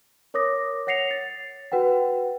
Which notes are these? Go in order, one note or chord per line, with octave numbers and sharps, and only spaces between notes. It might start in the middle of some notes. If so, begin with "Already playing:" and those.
A#4 C#5 D6 D#6 A#6
C#5 F#5 A#6 C7 C#7 F7
A6
F#4 B4 F#5 G5